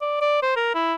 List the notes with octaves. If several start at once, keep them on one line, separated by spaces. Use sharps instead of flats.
D5
D5
C5
A#4
E4